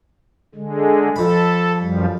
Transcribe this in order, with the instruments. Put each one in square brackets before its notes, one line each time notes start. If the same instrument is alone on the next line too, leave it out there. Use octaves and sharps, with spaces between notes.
[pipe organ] D3 G#3
[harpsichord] F2 B5 [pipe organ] A4
[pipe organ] F#2 F3 G3